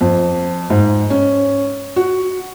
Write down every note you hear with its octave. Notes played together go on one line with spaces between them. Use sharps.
F2
G#2
C#4
F#4